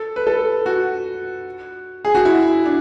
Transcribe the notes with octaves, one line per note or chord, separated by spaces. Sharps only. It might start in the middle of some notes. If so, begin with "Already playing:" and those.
Already playing: A4
B4
A4
F#4
G#4
F#4
E4
D4